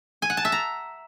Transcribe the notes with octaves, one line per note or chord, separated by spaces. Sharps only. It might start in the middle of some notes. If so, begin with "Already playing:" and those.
G#5
F#5
A5
E5
A#5